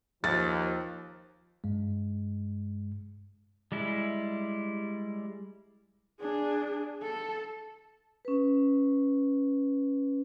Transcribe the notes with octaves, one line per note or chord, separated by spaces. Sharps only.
D#2 F3 A6
G2 G#3
G3 G#3 E4
D4 G#4
A4 A5
C#4 B4